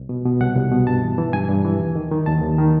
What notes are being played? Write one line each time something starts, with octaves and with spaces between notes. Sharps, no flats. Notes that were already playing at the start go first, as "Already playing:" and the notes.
Already playing: C2
B2
B2
C2 F#5
C2
B2
G2 A5
E3
E3
G2 G#5
G2
E3
D#2
D#3
D#3
D#2 A5
D#2
D#3